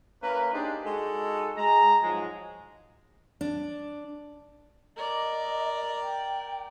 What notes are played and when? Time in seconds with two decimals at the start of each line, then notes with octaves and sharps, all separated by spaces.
0.22 A#3 C#4 E4 A#4 B4
0.53 D4 D#4 G4 G#4 C5
0.85 G#3 D#4 F#4 A4
1.57 G#3 A#5
2.03 G#2 F3 F#3 G#3
3.41 D4
4.96 A#4 D5 D#5
6.01 G5